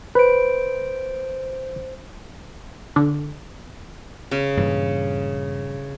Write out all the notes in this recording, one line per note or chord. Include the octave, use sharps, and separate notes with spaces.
B4 C5 D7
D3
C#3
G2 A#2 E3